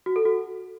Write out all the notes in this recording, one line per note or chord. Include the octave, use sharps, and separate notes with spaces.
F#4
A4
F#4